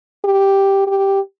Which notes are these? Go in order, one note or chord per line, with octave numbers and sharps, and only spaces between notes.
G4
G4